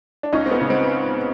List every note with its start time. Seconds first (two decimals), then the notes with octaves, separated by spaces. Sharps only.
0.23 D4
0.33 C#2 C#4 D#4
0.46 C4
0.51 B3
0.61 C#3
0.70 C4